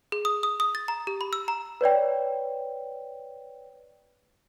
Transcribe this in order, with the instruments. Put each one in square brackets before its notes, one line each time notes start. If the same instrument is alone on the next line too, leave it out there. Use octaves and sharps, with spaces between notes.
[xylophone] G#4
D#6
D#6
D#6
A6
A#5
G4
B5
E6
A#5
[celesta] B4 C#5 D5 G5